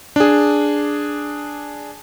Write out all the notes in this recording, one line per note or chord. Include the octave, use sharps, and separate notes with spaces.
D4 G#4